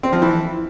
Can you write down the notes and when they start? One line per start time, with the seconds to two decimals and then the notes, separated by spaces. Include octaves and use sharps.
0.03 C4
0.13 F3
0.22 E3